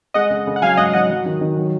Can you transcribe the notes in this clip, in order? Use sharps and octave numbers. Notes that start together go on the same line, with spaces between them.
G#3 D#5 F#5
C#3
C#3
F#5
F#3 F5 G#5
G#2 D#5 F#5
F#3 D#5 F#5
F#3
D#3
D#3
F#3